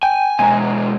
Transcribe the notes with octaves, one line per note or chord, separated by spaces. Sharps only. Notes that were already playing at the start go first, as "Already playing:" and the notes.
G5 G#5
B2 G#3 G#5 A#5